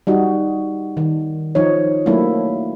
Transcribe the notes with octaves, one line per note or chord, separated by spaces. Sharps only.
G3 D#4 F#4
D#3
F3 D#4 C#5
F#3 A3 A#3 D4 E4